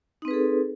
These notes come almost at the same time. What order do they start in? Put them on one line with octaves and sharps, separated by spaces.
D#4 C4 B4 G#4 A4